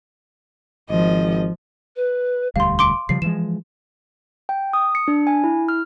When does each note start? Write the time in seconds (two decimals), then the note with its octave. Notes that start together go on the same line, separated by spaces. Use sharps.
0.90 G#1 F3 D#5
1.96 B4
2.56 E1 D2 G3 F5 C6
2.79 C6 D6 D7
3.09 C#3 F3 G3 C7
3.22 E3 F3 G#3 E7
4.49 G5
4.73 D#6
4.95 C#7
5.08 D4
5.27 G#5
5.44 E4
5.69 F6